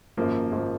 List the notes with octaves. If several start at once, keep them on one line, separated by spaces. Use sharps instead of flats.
G#1 F#2 F3 A#3
G#1 F3 A#3